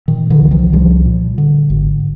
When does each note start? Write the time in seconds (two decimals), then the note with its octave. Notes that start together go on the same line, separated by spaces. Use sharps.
0.08 A#2 D#3
0.30 D3 E3
0.41 C2
0.51 D#3 F3
0.73 C2 F3 G3
1.06 A#2
1.38 D3
1.70 G#1